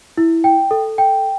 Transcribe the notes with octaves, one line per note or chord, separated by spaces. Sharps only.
E4
G5
A4
G5